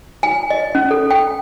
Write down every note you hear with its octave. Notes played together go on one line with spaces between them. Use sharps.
G#5
D#5
C#4
A4
G5